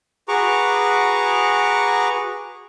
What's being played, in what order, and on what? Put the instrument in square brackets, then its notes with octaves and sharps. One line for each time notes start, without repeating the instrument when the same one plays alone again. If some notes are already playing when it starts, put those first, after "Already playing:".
[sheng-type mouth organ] F#4 G#4 B4 A#5 C#6 D6